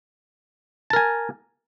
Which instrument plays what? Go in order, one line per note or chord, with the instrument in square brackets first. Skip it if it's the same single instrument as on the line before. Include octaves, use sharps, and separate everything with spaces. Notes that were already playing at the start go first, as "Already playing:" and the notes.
[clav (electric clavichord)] A5
A#4
G#5